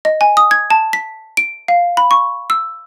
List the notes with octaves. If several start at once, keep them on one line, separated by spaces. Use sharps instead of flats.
D#5
G#5
D#6
G#6
A5
B6
D7
F5
B5
C#6
E6